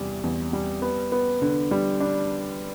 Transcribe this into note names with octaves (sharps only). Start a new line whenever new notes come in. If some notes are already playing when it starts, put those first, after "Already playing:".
Already playing: E2 C3 G3
E2
G3
B3
B3
D3
G3
D4